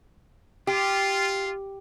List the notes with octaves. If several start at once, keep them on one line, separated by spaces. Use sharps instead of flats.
F4 G4